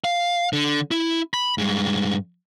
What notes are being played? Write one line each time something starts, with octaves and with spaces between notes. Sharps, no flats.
F5
D3
E4
B5
G2 G#3